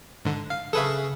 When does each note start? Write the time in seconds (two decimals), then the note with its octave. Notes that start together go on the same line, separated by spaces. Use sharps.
0.25 G#2 D3
0.50 F5
0.73 C#3 G#4 A4 B4 E5